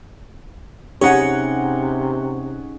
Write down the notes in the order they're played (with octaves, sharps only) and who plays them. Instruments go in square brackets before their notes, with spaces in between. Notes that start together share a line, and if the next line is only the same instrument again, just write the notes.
[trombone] C3 [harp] C#4 D#4 G#4 [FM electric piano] G4 [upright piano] C#5 F#5